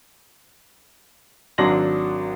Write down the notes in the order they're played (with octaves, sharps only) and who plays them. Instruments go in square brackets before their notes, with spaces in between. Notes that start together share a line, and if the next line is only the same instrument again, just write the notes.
[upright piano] G#1 F#3 D4 C6 A#6 F#7